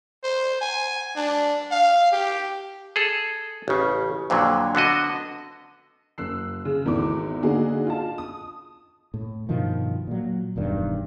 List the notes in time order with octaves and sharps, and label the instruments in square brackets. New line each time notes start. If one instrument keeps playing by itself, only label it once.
[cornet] C5
G#5
D4
F5
G4
[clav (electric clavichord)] G#4 A4
A1 C#3
F2 A#2 D3 F#3
D3 B3 F#4 D#5
[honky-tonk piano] F#1 E6 F#6 C7
C#3
G#1 E2 D#3 A3 E4 D6
D3 A#3 B3 D#4 F#4 G#4
F4 D#5 A5
D#6
[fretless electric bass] A2
G2 B2 D#3 F3
A#2 F#3
E1 E2 G2 D#3